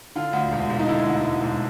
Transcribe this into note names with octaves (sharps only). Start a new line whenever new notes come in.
D3 F4
D2
E1
E1
D#4
D3 E4
D2
E1
E1